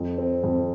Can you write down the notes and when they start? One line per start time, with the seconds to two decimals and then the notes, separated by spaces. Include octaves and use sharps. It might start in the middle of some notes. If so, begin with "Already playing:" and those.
Already playing: F2
0.18 C4
0.44 F2